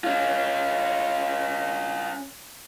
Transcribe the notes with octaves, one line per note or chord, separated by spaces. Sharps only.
C#4 F4